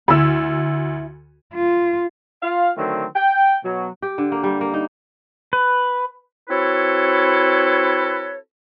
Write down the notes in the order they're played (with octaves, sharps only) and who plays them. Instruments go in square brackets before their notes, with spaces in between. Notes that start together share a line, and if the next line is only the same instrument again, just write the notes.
[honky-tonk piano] D2 E6 [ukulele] E4 B5
[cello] F4
[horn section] F4 F5
D3 D#3 F#3 A3 C4
G5
B2 F#3
[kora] G4
D3
A#3
G3
A#3
D#4
[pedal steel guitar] B4
[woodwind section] C4 E4 F#4 A4 B4 C#5